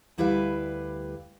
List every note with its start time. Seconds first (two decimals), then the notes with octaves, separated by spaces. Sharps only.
0.18 D2 G3 E4 G4 B4 F5